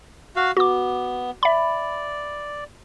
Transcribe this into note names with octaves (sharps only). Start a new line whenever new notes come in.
F#4 F5
B3 F#4 D6
D5 E5 B5